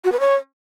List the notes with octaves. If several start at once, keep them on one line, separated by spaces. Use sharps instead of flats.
F#4
B4
C#5